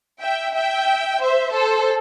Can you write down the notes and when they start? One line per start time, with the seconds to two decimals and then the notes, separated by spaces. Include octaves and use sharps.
0.20 E5 G5
0.55 E5 G5
1.21 C5 E5
1.55 A4 C5